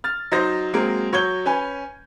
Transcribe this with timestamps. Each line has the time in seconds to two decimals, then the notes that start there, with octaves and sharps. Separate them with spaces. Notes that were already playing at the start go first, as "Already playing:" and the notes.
0.04 F6 A6
0.32 F#3 D#4 C5 A#6
0.74 F#3 G#3 A#3 C4
1.13 F#3 C#5 C#6 G6 G#6 G7
1.46 C#4 B4 G#5